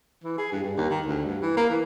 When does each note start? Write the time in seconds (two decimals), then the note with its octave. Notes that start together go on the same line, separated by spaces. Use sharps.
0.24 E3
0.38 G#4
0.52 G2
0.64 G2
0.77 D#2
0.90 D#3
1.06 D2
1.25 G2
1.42 E3
1.57 A#3
1.69 E3